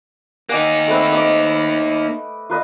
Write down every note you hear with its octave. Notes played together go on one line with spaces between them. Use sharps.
A#3 D#4 F#5 G#5 D6
A3 C4 B4
D#5 C#6 D6
F4 B4 D#5